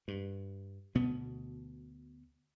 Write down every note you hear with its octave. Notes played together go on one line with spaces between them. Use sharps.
G2
D2 B2 B3